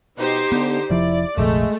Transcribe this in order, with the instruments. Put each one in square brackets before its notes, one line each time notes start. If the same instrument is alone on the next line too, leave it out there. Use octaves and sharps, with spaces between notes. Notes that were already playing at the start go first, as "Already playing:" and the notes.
[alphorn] B2 [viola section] D#4 G4 C5
[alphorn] D3 [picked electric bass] B3
[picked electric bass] F1 F2 F3 [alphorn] E4 [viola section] D5
[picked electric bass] F1 A#1 [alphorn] G#3 [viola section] A3